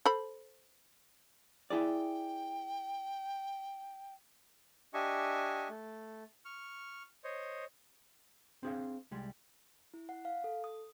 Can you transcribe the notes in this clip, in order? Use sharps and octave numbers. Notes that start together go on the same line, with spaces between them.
A4 C5 B5
E4 G#4 D5 G5
D4 G4 D#5 E5 G#5 C#6
A3
C#6 F6
C5 C#5 D#5
C4 D4 G#4 A4 C5 F5
C2 G3 G#3
E4
F#5
F5
A4
D#6